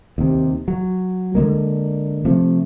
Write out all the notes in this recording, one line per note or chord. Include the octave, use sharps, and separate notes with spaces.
D#2 C3
F#3
D3 E3 G#3 A#3
C3 F3 A3